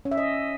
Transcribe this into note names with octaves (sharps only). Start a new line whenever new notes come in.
C#4
E5
D#5